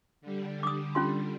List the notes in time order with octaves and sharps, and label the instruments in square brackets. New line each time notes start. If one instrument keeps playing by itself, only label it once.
[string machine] D3 G3
[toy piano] D6 D#6
C#4 F4 C6